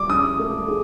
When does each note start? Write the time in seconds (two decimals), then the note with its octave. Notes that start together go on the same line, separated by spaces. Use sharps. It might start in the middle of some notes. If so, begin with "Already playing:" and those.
Already playing: G3 D6
0.09 C#4 D#6
0.39 A3
0.68 G#4